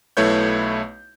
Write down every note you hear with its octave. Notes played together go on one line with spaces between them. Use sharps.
B1 A3 E4 B4 C#5 G6